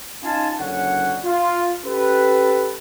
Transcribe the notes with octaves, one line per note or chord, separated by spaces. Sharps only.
C#4 D#4 F4 F5 G#5 A5
F#1 D3 C#4 F#5
F4
C#4 G4 A4 B4